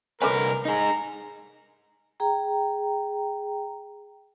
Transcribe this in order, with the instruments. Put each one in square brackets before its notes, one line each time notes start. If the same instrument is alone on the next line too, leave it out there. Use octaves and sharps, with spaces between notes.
[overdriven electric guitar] C2 B4 [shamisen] D3 A3 C#4 [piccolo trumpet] A#4
[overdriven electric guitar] D#4 G#4 [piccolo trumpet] A#5
[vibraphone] G#4 G5 A#5